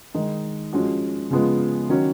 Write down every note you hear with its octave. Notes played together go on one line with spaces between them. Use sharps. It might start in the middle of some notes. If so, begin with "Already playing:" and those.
D#3 G#3 D#4
F3 G#3 C#4 F#4
C#3 F3 G#3 B3 F4
D#3 F#3 C#4 F#4